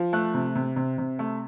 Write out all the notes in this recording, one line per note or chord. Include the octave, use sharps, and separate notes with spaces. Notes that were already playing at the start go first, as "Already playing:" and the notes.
Already playing: F3
A3 F#6
C3
C3
C3
C3
A3